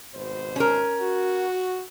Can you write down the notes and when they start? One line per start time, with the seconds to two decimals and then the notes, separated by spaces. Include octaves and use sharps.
0.14 G#1 B2 C5
0.56 C#4 A#4
1.00 F#4